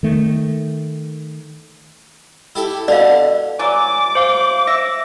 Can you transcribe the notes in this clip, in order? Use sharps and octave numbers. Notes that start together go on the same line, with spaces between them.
D#3 A3
E4 G4 A4
B2 D3 D5 F5
E3 F#3 D5 G#5 D6
C5 F5
E5 A#6